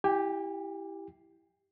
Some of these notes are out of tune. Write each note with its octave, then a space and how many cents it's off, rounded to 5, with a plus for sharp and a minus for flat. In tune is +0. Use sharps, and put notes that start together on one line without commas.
E4 +0 G4 +0 G#5 -40